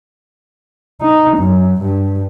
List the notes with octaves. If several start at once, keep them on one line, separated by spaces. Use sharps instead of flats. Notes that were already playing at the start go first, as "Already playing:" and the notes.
D#4
F#2
G2